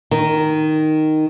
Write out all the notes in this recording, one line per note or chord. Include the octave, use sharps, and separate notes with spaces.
D#3